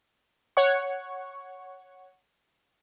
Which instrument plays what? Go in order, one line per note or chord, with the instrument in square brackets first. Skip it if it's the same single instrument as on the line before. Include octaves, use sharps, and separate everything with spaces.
[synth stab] C#5 F#5 C#6